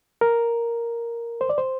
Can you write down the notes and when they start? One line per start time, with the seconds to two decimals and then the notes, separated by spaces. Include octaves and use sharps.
0.21 A#4
1.41 C5
1.50 D5
1.58 C5